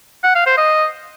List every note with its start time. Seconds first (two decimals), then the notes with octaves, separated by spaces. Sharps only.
0.24 F#5
0.35 F5
0.46 C5
0.58 D#5